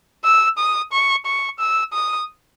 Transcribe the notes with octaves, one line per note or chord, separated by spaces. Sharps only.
E6
D#6
C#6
C#6
E6
D#6